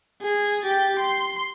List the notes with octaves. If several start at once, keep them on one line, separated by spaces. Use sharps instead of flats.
G#4
G4 A6
C6